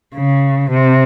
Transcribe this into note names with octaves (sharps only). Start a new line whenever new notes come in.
C#3
C3